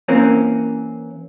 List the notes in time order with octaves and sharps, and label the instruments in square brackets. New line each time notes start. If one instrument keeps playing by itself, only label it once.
[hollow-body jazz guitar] E3 A#3 C4 C#4